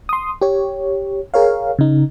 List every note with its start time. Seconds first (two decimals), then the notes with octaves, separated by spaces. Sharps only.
0.09 C6 D#6
0.42 G4 C#5
1.34 G#4 A#4 C#5 F5
1.79 C#3 D#4